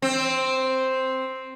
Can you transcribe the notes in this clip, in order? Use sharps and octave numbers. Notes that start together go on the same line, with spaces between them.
C4